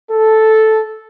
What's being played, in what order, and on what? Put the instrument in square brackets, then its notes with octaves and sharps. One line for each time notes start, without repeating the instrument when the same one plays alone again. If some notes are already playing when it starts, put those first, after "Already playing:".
[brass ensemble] A4